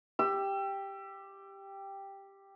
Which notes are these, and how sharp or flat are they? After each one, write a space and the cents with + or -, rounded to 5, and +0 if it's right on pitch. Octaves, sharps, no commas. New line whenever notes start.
G4 +5 E6 +35